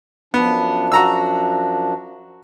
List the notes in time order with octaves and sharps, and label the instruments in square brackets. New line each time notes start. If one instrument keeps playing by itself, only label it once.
[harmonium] F#2 F3 D4 [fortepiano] B3
[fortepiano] F#4 A#5 E6